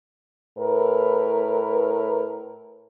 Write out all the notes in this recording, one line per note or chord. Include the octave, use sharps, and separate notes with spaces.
A2 A#4 B4